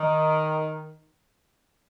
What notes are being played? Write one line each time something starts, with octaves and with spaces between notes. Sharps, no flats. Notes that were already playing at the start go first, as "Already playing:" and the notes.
Already playing: D#3